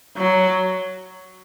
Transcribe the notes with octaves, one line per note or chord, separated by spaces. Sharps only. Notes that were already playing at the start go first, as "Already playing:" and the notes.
F#3